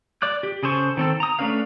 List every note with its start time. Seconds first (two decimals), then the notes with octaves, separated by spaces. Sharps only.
0.22 D5 D6 F#6
0.43 G4
0.63 C#3 G#4 A4 C5 C#6
0.97 D#3 C4 A4
1.20 A#5 D#6
1.39 A3 C#4 D4 B4 F5